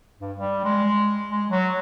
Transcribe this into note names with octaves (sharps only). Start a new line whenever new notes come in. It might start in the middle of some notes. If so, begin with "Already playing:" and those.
G2
G3
G#3
G#3
F#3